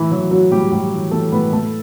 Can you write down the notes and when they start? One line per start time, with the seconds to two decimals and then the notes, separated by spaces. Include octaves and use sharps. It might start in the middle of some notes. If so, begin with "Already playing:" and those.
Already playing: A2 E3 E4
0.11 E3 F#3 F#4
0.31 E3 F#3 F#4
0.52 A2 G3 G4
0.72 A2 G3 G4
0.93 E3
1.11 E3 A3 A4
1.32 A2 B3 B4
1.52 A2 A3 A4